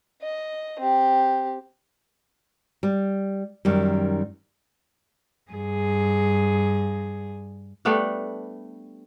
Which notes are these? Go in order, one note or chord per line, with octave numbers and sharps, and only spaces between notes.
D#5
C4 G4
G3
F#2 D#3 G3
G2 G#4
G3 A3 B3 D4